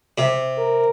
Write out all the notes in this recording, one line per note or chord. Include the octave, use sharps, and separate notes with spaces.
C3
A#4